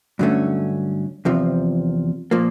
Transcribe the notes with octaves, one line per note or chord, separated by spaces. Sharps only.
G2 D3 F#3 A3 C#4
E2 C3 F3
A#2 F3 A#3